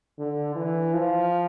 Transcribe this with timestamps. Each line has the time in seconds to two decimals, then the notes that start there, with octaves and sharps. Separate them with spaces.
0.18 D3
0.56 E3
0.94 F3